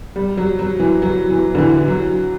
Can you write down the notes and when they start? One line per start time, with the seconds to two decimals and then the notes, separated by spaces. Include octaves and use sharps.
0.16 G3
0.37 F#3
0.59 F#3
0.80 E3
1.02 F#3
1.30 E3
1.55 D3
1.58 E3
1.88 F#3